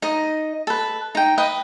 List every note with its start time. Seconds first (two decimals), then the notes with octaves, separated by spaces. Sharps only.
0.02 D#4 D#5
0.67 A4 B4
1.15 D#4 G5
1.38 B4 D#5 D#6